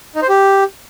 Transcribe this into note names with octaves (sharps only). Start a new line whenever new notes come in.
D#4
C5
G4